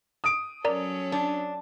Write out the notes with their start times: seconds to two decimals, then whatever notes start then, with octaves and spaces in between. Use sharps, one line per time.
0.24 D#6 D7
0.65 F#3 C#4 A4 A#4 D5 A#5
1.12 D4